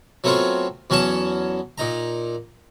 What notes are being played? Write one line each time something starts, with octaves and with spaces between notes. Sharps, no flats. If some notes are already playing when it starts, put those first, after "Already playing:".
F#3 A3 B3 C4 F4 C#5
E2 F#3 C#4 F#5 A5
A#2 D#4 A#5